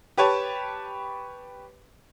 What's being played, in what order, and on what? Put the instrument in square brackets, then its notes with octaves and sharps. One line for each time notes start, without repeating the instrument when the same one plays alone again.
[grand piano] G4 B4 C#5 A5